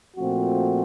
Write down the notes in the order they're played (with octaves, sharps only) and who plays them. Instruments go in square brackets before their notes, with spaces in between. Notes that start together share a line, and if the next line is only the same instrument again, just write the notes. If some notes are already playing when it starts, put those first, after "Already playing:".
[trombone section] A#2 F3 A3 C4 F#4